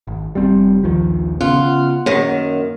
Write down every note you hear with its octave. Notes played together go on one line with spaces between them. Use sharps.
G#1
F1 G3 C4
A#1 D#2 D#3 F3
C#3 B3 C#4 F4 F#5
F#2 D#3 A#3